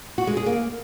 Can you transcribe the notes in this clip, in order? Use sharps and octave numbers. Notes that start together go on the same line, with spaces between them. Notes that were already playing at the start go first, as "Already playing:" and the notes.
F#4
G#3
G#4
A#3